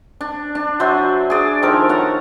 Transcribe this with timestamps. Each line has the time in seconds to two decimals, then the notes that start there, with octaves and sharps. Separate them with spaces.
0.21 D4
0.55 D4
0.80 F#3 C5 E5 G#5
1.30 G#4 D5
1.62 D#3 F3 A4 A#4
1.89 C#5 F5 F#5